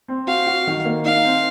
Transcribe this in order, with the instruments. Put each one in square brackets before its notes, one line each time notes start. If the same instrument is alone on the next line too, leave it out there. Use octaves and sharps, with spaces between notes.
[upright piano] C4
[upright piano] F#4 [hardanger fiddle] F5
[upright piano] F#4
D#3
A#3
[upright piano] D#4 [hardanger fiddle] F5
[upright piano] C4